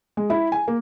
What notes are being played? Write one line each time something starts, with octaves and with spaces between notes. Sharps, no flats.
G#3
E4
G#5
A#3